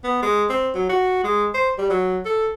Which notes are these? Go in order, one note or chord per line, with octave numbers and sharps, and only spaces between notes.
B3
G#3
C4
F#3
F#4
G#3
C5
G3
F#3
A4